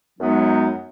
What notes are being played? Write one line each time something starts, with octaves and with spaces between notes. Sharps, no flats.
F#2 F#3 G#3 B3 D#4